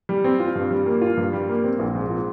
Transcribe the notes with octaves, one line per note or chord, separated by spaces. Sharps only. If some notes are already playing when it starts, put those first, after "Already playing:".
G3
C4
F4
G2
G3
A#3
F4
G2
G3
A#3
C4
A#1
G#2
F3